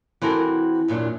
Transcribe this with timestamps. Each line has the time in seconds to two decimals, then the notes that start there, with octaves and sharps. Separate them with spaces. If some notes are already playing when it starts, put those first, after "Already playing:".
0.22 E3 C4 F#4 A4 A#4
0.88 E2 A#2 F#3 D4